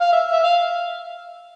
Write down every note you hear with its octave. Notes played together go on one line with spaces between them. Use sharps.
F5
E5
E5
F5